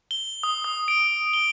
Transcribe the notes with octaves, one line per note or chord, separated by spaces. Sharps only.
G7
D#6
D#6
D7
G7